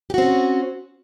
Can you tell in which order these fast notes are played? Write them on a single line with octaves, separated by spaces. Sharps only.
G4 F#4 C4 C#4